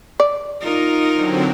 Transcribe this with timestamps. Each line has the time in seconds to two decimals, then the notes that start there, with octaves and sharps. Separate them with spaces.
0.20 D5
0.61 D#4 F4 A#4
1.13 D3 F#3 C4